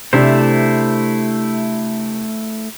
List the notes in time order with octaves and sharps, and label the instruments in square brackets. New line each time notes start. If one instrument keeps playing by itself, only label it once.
[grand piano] C3 D4 [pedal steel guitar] A3 E4 C5